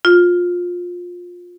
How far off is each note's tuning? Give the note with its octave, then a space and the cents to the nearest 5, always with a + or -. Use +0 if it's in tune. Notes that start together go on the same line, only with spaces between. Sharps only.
F4 +20